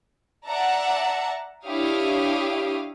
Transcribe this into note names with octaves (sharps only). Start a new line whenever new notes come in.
D5 E5 F#5 A5 A#5
D4 E4 G4 C#5 F5 D#6